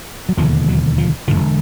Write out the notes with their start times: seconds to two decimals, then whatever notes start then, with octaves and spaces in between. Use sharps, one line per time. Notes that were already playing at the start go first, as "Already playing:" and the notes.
0.29 F#3
0.37 E1 D#2 D3 F3
0.68 F#3
0.98 F3
1.28 E1 D#2 D3 F3